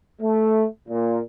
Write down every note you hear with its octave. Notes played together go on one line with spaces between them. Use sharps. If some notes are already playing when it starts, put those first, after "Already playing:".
A3
A#2